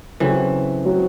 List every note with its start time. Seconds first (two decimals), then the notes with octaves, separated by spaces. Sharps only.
0.20 C#3 E3 F#3 C4 F#4 A4
0.85 F#3 C4 F#4 C#5